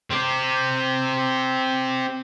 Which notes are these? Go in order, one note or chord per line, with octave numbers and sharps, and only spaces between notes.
C4 G4